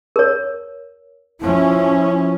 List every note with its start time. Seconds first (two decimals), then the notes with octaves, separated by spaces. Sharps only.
0.16 A#4 C#5
1.41 F3 C#4 E4